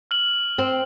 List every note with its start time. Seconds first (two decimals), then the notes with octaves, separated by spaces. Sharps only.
0.11 F6 F#7
0.58 C4